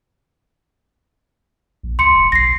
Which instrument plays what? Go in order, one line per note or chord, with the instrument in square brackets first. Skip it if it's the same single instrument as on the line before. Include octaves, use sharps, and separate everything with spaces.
[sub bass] A#1
[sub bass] C#2 [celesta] C6 C#7
[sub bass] E1
[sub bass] B1 [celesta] A#6 C7